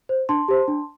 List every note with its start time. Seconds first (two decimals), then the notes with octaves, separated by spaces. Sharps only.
0.09 C5
0.29 D4 A5 C6
0.48 G4 C5
0.68 D4